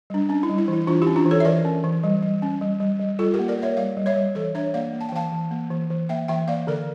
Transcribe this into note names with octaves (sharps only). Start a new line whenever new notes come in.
G3 D4
C#4 D4
E4
G3
E4
E3
E4
E3 D4 F4
C#4 E4 G4
D4 F4
E3
A4 C#5
E5
E3 A#4 D5
C#4
E3
G3
G3
C#4
G3
G3
G3
G3 F4 A4
G4 A#4
A#3
A#4 D5
A#3 C#5 E5
G3 D5 F5
G3
C#5 E5
G3
E3 A4 C#5
D4 C#5 E5
A#3 D5 F5
A#3
A5
G5
E3 F5 A5
E3
A#3
E3
E3
A#3 E5 G5
E3 E5 G5
A#3 D5 F5
D3 A#4 D5